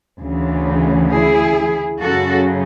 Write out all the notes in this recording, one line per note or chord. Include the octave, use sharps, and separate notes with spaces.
D2 C#3 E3
E4 G#4
F#2 C#3 F#3 F#4 A4